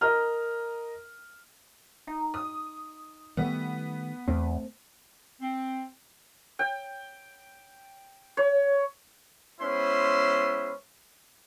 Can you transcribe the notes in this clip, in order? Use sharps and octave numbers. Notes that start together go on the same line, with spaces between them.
A#4 D#5 A#5 F6
D#4
D#6
D#3 G3 A3 B3
E2 A3 C4
C4
G5
C#5
G#3 B3 C#4 E4 C5 C6